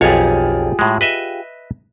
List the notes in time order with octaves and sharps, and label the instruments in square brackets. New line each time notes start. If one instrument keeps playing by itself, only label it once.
[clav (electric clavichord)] B1 F2 C#5 [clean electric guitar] F4 G4 G#4
[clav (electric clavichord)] A2 G#3
B4 D#5 E5